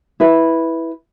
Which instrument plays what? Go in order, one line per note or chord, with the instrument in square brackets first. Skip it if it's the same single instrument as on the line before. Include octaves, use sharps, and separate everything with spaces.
[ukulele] E4 B4